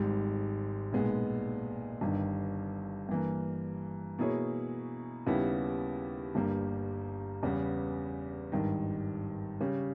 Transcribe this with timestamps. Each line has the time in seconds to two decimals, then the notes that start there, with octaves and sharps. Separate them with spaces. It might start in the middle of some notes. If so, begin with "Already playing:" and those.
Already playing: G#1 G#2 G3
0.92 B1 A#2 G#3 B3
2.01 G1 G2 D#3
3.09 G2 E3 A#3
4.18 B2 A#3 E4 G#4 C#5
5.26 D#2 C#3 G3 B3 E4
6.35 G1 G2 G3 A#3
7.43 E2 C#3 G3 B3
8.52 G#1 G2 D#3
9.60 C#3 G3 C#4